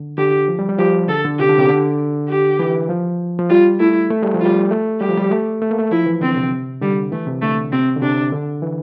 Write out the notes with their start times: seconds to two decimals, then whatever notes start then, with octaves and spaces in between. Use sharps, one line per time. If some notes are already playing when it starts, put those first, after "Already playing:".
Already playing: D3
0.18 D3 G4
0.48 F3
0.59 G3
0.69 G3
0.79 F3 G4
1.08 D3 A4
1.24 D3
1.39 C3 G4
1.49 D3
1.58 C3
1.69 D3
2.30 G4
2.59 E3
2.89 F3
3.39 F3
3.50 G3 F4
3.80 A3 E4
4.10 A3
4.22 G3
4.34 F3
4.41 F4
4.46 G3
4.71 A3
5.01 G3 G4
5.09 F3
5.18 G3
5.31 A3
5.62 A3
5.70 A#3
5.79 A3
5.91 F3 E4
6.06 E3
6.21 D3 C4
6.36 C3
6.81 D3 G3
7.12 E3 A3
7.27 C3
7.42 D3 A3
7.72 C3 C4
7.97 D3
8.02 C3 D4
8.32 D3
8.62 E3